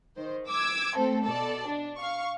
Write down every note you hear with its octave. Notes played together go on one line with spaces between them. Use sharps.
D#3 C5
D6 E6 G#6
A3 C4 A4
B2 A4 D5 A5
D4
F5 C#6